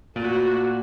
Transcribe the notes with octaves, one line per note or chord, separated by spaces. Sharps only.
A#2 A3 F#4